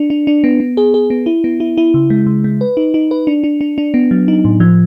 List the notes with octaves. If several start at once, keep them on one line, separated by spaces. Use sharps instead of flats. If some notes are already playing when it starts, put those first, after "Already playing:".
Already playing: D4
D4
D4
B3
B3
G#4
G#4
B3
E4
B3
E4
E4
C#3
G#3
C#3
G#3
B4
D#4
D#4
B4
D4
D4
D4
D4
B3
F#3
D#4
A2
F3